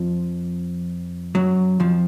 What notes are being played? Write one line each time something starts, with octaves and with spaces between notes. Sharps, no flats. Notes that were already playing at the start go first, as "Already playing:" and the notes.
Already playing: F2 F3
F#2 F#3
F2 F3